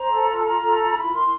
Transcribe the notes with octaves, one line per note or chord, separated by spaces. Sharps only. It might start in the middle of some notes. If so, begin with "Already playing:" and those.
Already playing: C5 A#5
A4
F4
A5
F4 A#5
A4
F4
E4 B5
A#4 C6